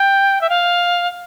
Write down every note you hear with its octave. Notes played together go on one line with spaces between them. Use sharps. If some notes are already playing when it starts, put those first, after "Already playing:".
Already playing: G5
E5
F5